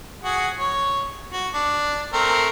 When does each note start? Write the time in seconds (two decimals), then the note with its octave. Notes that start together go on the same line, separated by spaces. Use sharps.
0.24 F#4 G#4 F#5
0.59 C#5
1.33 F#4
1.54 D4
2.13 A3 C4 A#4